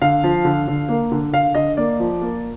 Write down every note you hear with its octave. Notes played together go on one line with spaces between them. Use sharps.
D3 F5
F3
D3
D3
A#3
D3
D3 F5
D3 D#5
A#3 D5
F3
A#3